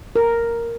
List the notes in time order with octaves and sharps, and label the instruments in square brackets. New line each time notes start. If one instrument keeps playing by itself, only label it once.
[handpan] A#4